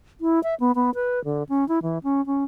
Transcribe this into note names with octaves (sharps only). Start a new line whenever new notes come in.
E4
E5
B3
B3
B4
D3
C#4
E4
E3
C#4
C#4